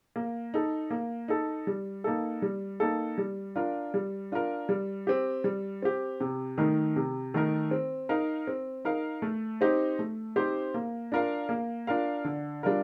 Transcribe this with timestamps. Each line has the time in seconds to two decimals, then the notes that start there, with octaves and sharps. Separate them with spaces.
0.16 A#3
0.54 D#4 A4
0.91 A#3
1.28 D#4 A4
1.67 G3
2.04 A#3 D#4 A4
2.42 G3
2.80 A#3 D#4 A4
3.18 G3
3.56 D4 F4 A#4
3.94 G3
4.32 D4 F4 A#4
4.69 G3
5.07 C4 G4
5.44 G3
5.82 C4 G4
6.20 C3
6.58 D#3 A3 D#4 A#4
6.96 C3
7.34 D#3 A3 D#4 A#4
7.71 C4
8.09 D#4 A#4 F5
8.47 C4
8.85 D#4 A#4 F5
9.22 A3
9.61 C4 D#4 G4 C5
9.99 A3
10.36 C4 D#4 G4 C5
10.74 A#3
11.12 D4 F4 A#4 F5
11.49 A#3
11.87 D4 F4 A#4 F5
12.25 D3
12.63 G3 D4 F4 A#4